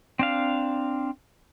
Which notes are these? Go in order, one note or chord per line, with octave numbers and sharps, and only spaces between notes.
C4 D4 F5